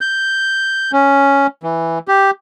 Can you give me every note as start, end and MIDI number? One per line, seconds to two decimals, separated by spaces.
0.01 0.92 91
0.93 1.47 61
1.63 1.99 52
2.08 2.31 67